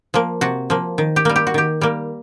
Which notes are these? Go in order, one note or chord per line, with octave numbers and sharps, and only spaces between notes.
F3 A#3
C3 F#4
F3 A#3
D#3
G4
G3 A#3
G4
F#4
D#3 G4
G3 A#3